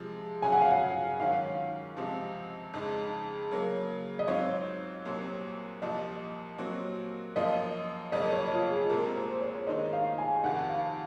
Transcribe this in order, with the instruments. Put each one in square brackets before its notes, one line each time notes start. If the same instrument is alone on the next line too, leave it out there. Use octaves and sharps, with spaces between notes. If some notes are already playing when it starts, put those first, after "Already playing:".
Already playing: [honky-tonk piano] C3 F3 G#3
[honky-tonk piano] C#3 F#3 C#4 F#4 [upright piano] G#5
[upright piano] F#5
F5
F#5
[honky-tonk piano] G#2 D#3 F#3 C#4 [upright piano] F5
[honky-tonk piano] C#2 C3 F3 C4
F2 C#3 G#3 D#4
C#3 F#3 A#3
[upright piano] D#5
[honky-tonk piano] G#2 F#3 C4 F4 [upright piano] C#5
[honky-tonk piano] C2 A#2 F#3 C4
[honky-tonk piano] C2 A#2 F3 [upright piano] D#5
[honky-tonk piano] A#2 F#3 C4 F#4
[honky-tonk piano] F#2 F3 A#3 F4 [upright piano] D#5
[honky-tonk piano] F2 C#3 F#3 A#3 [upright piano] D#5
[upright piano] C#5
F4
G#4
[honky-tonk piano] C2 A#2 G#3 C4 [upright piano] A#4
[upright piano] C5
C#5
[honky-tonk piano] D#2 D#3 G#3 D#4 [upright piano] D#5
[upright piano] F5
G#5
[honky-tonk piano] F2 C3 D#3 [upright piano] F#5
[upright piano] F5